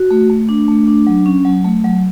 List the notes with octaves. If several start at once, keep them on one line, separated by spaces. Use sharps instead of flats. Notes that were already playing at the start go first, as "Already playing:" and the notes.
Already playing: F#4
A3
A3
D4
A3
D4
F#3
C#4
F#3
A3
F#3